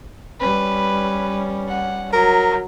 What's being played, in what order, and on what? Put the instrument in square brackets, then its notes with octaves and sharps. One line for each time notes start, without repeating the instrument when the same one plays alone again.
[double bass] G3 C#4 [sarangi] B4
[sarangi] F#5
[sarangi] F#3 [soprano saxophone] A#4